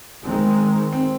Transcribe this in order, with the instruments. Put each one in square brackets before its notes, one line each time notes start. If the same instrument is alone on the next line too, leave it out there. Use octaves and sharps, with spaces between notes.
[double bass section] D#3 G#3 C4
[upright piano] C4